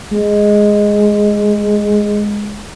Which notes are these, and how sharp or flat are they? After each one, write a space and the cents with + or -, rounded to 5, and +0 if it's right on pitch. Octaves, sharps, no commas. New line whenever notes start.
G#3 -5